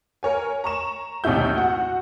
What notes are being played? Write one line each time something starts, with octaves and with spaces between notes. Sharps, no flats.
A#4 C#5 G#5
A#5 C#6 E7
A1 D#2 C3 D#4 E4 G6
F#4 F#5